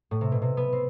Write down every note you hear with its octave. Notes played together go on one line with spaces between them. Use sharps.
A2
C3
B2
C3
B3
C4